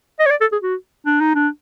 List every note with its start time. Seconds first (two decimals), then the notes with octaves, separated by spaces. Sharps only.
0.20 D#5
0.26 C#5
0.30 D5
0.41 A4
0.52 G#4
0.62 F#4
1.06 D4
1.21 D#4
1.35 D4